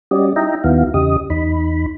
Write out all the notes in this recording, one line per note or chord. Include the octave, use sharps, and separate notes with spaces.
G3 C#4 F#4 G4 D5 D#5
D#4 E4 D#5 E5 G5 A#5
D#2 D#3 B3 E4 F#4 F5
E2 C#3 G4 D#5 D#6
E2 D#4 B5